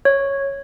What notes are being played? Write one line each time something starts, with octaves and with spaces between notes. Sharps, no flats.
C#5